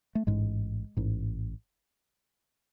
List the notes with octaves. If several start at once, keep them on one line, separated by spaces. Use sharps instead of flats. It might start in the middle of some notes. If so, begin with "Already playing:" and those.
A3
A1 G#2 G#3
A1 G#2